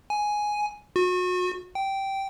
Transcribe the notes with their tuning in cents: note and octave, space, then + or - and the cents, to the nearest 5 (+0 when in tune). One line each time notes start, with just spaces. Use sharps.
G#5 +5
F#4 -35
G5 -10